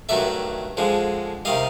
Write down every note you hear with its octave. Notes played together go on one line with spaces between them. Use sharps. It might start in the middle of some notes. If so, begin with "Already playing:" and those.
G2 D#3 F#3 A3 D5 E5
F2 D3 F3 G#3
C3 D#3 G3 D#5 F5